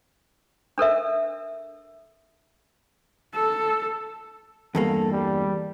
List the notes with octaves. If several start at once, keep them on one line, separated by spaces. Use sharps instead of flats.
D4 A4 A#4 E5
A4
E2 G2 A#3 A4
G3